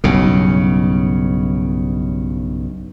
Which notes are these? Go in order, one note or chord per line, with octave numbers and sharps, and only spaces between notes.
B1 G2 C#3